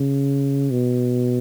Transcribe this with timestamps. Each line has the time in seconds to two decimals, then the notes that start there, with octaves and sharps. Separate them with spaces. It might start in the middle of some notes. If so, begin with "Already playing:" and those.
Already playing: C#3
0.70 B2